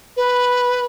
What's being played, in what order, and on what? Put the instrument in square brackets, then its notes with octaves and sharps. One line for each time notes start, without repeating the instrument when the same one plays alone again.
[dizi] B4